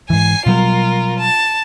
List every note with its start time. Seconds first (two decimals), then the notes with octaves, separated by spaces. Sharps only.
0.10 G#2 E3 G#5 C7
0.46 B2 F#3 G3 F4 A#4
1.19 A5